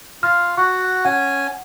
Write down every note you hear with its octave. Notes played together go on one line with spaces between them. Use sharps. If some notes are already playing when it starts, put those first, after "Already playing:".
F4 F6
F#4 F#5 C#6
C#4 F#5 G#5